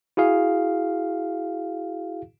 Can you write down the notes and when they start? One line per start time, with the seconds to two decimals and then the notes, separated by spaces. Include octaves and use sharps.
0.17 E4 F#4 G#4 F5